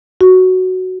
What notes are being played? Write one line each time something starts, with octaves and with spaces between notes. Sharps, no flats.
F#4